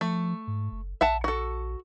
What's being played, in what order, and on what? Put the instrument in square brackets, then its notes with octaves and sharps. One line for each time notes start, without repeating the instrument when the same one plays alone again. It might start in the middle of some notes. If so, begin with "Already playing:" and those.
[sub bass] F3 [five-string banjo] A3
[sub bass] G#2
F#1
[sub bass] A#1 [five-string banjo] E5 F#5 A5
[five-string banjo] F#4 A4